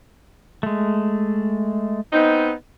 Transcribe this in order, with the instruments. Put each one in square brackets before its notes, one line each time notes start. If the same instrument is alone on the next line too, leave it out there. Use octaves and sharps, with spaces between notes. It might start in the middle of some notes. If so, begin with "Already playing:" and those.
[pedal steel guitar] G#3 A3
[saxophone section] B3 C4 D#4